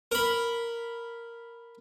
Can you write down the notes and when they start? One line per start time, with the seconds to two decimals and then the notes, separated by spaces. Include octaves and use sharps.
0.12 A#4 B5